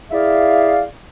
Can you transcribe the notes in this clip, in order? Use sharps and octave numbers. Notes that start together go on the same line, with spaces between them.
E4 G#4 D5 E5 F5